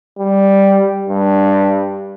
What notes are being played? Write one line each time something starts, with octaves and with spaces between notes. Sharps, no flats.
G3
G2